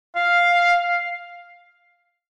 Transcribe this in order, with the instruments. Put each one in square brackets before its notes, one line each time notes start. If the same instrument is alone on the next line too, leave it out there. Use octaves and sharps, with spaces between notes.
[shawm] F5